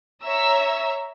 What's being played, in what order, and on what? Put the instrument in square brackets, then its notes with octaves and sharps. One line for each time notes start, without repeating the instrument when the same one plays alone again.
[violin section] C#5 E5 A#5 E6